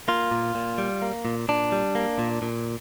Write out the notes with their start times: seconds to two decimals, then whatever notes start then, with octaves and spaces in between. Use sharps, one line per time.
0.08 A#3 F4
0.31 A#2
0.55 A#2
0.78 G3
1.02 A#3
1.25 A#2
1.49 A#2 D4
1.72 G3
1.95 A#3
2.19 A#2
2.42 A#2